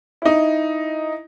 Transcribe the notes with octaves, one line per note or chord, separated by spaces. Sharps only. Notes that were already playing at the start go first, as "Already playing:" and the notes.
D#4 E4